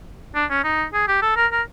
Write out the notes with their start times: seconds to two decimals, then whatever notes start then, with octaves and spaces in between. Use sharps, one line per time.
0.35 D4
0.50 C#4
0.64 D#4
0.94 G#4
1.08 G4
1.22 A4
1.36 A#4
1.52 A#4